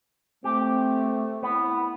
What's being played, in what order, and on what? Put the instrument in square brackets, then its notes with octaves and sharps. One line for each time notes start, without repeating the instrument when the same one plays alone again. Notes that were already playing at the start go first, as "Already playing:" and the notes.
[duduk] A3 [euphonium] C4 [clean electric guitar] G4
[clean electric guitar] B3 [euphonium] E4